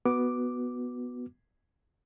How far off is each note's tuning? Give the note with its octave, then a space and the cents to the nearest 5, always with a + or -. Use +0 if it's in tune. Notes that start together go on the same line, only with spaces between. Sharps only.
B3 +0 F#4 +0 D6 +0